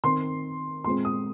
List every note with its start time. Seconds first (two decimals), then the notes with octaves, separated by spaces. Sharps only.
0.04 D#3 C4 C6
0.84 A#2 G#3 C4 C6
1.05 D#6